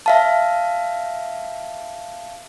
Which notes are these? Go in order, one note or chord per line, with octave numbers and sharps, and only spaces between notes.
E5 F5 A5